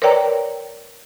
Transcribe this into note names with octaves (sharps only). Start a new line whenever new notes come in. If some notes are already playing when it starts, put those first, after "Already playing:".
A#4 B4 C#5 D5 G5 A#5